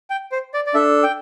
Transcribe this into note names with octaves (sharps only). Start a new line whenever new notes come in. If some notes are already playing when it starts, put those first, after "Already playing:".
G5
C5
D5
D5
D4 A4 E5
G5